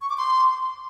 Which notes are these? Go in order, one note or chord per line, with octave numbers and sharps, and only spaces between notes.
C#6
D6
C6